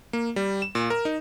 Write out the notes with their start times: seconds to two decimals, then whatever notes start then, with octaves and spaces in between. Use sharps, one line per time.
0.13 A#3
0.36 G3
0.62 E7
0.75 A#2
0.90 A#4
1.05 D#4